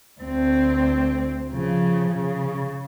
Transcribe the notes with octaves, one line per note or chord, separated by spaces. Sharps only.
D2 C4
C#3 F3
C#3